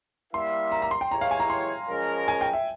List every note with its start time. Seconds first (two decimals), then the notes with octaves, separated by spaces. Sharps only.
0.33 G3 A#3 E4 A#4 E5 C6
0.72 A#5
0.82 A#5
0.91 C6
1.01 G5
1.11 E3 G#3 E4 G4 C#5 A#5
1.21 F5
1.31 G#5
1.40 A#5
1.50 C6
1.89 F3 G#3 C#4 F4 A#4
2.28 G#5
2.41 G5
2.53 E5